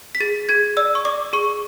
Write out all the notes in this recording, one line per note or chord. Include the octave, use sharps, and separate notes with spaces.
B6
G#4 A6
G#4 G#6
D5 E6
C#6
D5 D6
G#4 C#6